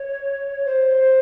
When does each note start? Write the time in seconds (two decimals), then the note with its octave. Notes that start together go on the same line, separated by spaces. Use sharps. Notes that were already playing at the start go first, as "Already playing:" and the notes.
Already playing: C#5
0.66 C5